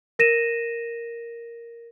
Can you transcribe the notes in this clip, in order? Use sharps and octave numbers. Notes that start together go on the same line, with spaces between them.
A#4 A#6 D#7 E7